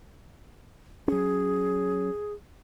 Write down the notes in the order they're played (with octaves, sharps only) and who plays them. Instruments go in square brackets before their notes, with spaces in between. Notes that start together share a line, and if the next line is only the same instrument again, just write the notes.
[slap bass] F#3 C#4 [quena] G#4